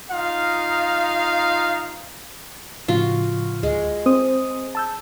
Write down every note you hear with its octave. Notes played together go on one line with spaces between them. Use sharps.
D#4 F4 F5
A2 C#3 F3 F4 F#4
D2 G#3
C4 C5 D#6
A5 E6 G6